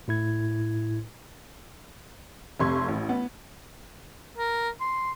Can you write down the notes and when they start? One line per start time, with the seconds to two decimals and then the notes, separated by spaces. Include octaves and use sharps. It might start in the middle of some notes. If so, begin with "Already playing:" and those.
0.08 A2 E4 G#6
2.59 F1 C3 C6 C#6 G#6
2.88 A1
3.09 B3
4.38 A#4
4.81 C6